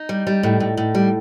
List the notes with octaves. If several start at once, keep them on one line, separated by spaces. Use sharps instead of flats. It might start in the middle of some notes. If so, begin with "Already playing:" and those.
Already playing: D#4
G3
G3
A2
A2
A2
G3